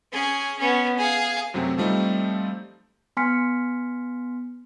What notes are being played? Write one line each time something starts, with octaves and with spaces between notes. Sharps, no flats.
C#4 G#4
B3 C#4
G#4 F5
F#2 C3 F#3 A3 C4
F3 G3 A3 C4 D#4
B3 G#5 C6 F6 B6 C#7